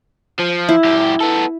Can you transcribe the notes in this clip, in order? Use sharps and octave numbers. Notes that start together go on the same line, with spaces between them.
F3
E4
F#2 G4
B3 A4